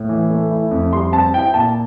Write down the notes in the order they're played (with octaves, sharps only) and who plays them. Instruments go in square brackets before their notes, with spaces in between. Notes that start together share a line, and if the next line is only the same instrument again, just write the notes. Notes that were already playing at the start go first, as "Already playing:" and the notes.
Already playing: [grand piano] A2
E3
A3
E4
F2
[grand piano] G3 [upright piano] C6
[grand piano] C4 [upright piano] A5
[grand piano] E4 [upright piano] G5
[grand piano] A#2 [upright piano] A5